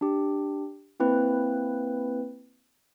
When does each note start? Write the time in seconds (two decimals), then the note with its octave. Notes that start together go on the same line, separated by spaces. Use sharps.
0.01 D4 G4
1.00 A#3 C4 E4 B4